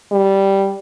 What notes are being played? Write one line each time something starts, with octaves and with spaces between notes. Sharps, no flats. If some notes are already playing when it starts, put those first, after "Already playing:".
G3